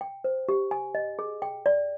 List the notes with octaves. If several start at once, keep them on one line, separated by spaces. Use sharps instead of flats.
G5
C5
G4
G#5
D#5
G#4
G5
D5